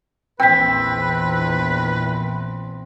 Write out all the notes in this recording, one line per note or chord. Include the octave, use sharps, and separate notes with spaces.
A#1 E2 C4 B4 G5 B6